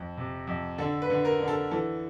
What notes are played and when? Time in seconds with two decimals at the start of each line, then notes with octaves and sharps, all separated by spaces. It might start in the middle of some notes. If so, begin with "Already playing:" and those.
Already playing: F2
0.17 C3
0.47 F2
0.78 D3 A4
1.02 B4
1.10 D3
1.25 A#4
1.40 D3
1.48 A4
1.71 E3 A4